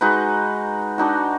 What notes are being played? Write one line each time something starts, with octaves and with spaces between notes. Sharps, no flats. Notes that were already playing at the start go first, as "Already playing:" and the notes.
G#3 D#4 F#4 B4
D4 D#4 F#4